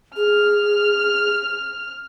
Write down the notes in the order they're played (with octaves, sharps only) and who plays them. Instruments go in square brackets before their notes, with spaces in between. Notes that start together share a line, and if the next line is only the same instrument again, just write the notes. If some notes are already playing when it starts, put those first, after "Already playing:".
[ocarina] G#4 [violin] F6